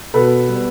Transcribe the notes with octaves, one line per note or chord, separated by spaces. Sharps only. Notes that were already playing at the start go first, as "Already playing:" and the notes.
B2 A4 B4
G3 B3